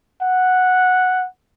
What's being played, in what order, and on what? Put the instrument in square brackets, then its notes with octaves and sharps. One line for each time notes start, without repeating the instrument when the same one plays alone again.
[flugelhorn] F#5